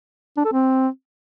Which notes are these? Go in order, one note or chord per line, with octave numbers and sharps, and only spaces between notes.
D4
A4
C4